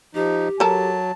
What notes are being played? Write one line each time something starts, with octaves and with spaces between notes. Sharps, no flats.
F3 D#4 G4
F#3 A4 A#4 A5